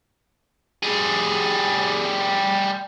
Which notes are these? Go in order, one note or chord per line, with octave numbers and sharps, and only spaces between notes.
G3 G#4